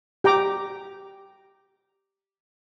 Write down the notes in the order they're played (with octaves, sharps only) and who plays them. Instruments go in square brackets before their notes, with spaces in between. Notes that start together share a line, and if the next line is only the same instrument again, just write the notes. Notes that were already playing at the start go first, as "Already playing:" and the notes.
[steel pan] G4 G5 A#5 D6